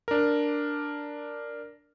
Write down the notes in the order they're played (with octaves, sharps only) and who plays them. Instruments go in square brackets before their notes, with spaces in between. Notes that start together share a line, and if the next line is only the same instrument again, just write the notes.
[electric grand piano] D4 A#4